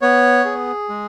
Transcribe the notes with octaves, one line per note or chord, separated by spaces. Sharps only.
B3 C#5
G#4
G#3